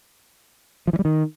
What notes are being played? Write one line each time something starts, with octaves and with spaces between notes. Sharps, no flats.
F3
E3
G3
D#3